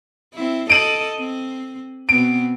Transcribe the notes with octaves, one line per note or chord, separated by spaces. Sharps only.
C4 E4
A4 D#5 D7 D#7 F#7
C4
B2 B3 C4 D7